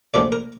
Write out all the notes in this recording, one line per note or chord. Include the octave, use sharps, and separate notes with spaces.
A#1 A#2 F3 A3 D5
A#4